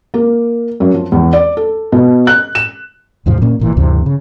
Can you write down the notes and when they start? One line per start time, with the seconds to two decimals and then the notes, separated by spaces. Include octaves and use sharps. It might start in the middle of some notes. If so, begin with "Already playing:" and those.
0.14 A#3
0.80 F#2
0.94 F3
1.12 E2
1.33 D5
1.57 A4
1.92 B2
2.27 F#6
2.55 E7
3.26 E2 G#2 C3 F3
3.42 A#2 A#3 C#4
3.60 A1 A#2 E3
3.77 D2 G2 C3 E3
4.06 C#3